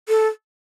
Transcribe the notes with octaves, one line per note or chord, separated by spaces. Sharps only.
A4